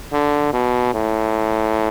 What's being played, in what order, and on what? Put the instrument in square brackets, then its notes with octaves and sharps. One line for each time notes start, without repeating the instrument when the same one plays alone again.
[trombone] D3
B2
A2